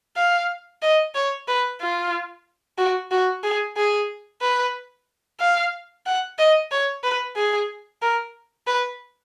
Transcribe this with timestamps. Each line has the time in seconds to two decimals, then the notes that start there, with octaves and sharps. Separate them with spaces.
0.16 F5
0.82 D#5
1.15 C#5
1.48 B4
1.81 F4
2.78 F#4
3.11 F#4
3.44 G#4
3.77 G#4
4.42 B4
5.40 F5
6.06 F#5
6.38 D#5
6.71 C#5
7.04 B4
7.36 G#4
8.02 A#4
8.67 B4